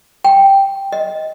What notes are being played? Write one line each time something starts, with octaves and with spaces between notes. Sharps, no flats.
G5
D#5